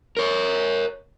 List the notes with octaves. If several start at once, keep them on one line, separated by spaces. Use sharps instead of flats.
A#4 C#5